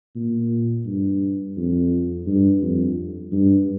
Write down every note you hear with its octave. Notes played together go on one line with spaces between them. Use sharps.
A#2
G2
F2
G2
F2
G2